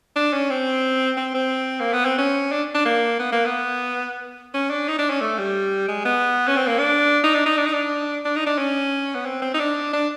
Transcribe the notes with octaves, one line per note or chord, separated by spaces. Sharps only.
D4
C#4
C4
C4
C4
A#3
B3
C4
C#4
D4
D4
A#3
B3
A#3
B3
C#4
D4
D#4
D4
C#4
A3
G3
G#3
B3
C#4
C4
A#3
D4
D#4
D4
D#4
D4
D#4
D4
D4
D#4
D4
C#4
B3
C4
C4
D#4
D4
D4